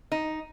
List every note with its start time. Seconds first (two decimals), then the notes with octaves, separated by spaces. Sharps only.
0.12 D#4